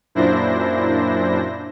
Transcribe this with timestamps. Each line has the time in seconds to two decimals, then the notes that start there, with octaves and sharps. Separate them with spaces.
0.15 F#2 A#2 D4 E4 C5 A#6